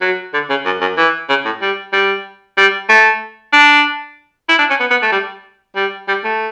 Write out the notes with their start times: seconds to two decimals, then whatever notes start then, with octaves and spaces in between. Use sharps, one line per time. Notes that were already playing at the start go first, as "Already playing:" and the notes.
0.01 F#3
0.34 D3
0.50 C#3
0.66 F#2
0.81 F#2
0.98 E3
1.29 C#3
1.45 A2
1.61 G3
1.93 G3
2.57 G3
2.89 A3
3.53 D4
4.49 E4
4.59 D4
4.70 C#4
4.80 B3
4.91 B3
5.02 A3
5.12 G3
5.76 G3
6.08 G3
6.24 A3